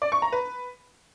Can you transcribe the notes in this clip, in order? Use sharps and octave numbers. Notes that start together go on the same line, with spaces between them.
D5
C#6
A#5
B4